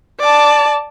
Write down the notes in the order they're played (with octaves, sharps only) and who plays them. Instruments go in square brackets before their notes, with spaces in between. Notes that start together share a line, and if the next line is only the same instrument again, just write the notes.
[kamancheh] D5 A5